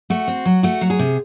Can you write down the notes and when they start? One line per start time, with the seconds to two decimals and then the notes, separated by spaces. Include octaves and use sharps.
0.10 A3 F#4
0.28 C4
0.45 F#3
0.63 A3 F#4
0.81 F#3
0.90 G#4
0.99 C3